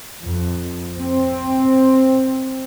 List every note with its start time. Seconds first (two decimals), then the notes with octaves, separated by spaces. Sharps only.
0.22 F2
0.99 C4